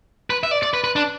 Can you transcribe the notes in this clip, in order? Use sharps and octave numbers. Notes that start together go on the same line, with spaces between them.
B4
E5
D5
D5
B4
B4
D4